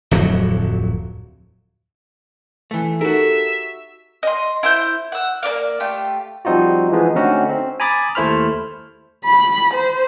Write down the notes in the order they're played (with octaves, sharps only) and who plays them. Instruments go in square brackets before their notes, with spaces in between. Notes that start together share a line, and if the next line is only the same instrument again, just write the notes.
[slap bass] D1 F2 F#3
[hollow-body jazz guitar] E3 A3
[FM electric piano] D#4 G4 A4 [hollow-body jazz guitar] F#4 A#4 [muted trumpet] E5
[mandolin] D#5 C6
E4 C5 G6
F#5 E6
A#3 A#4 D5 F5
A3 F4 G4
[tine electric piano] F3 G3 C4 D#4 F4 F#4
E3 F3 G#3 B3 D#4
D3 A3 C4 C#4 D#4 F#4
C4
G#5 A#5 B5 D6 D#6 A6
D#2 A3 E4 C5 B5 F6
[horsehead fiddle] B5
C5